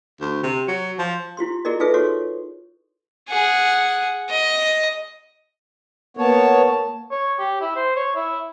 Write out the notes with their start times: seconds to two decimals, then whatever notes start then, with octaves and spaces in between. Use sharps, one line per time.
0.20 D2
0.43 C3
0.68 F#3
0.99 F3
1.37 E4 F4 G4 C6
1.65 E4 F#4 G#4 A#4 D5 D#5
1.80 D#4 F4 G#4 A4 B4 E5
1.94 F#4 A4 C#5 C#6
3.29 G#4 F#5
4.30 D#5
6.17 A#3 B3 C#5 A5
7.11 C#5
7.39 G4
7.61 E4
7.76 C5
7.96 C#5
8.16 E4